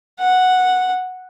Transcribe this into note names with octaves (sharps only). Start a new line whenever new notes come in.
F#5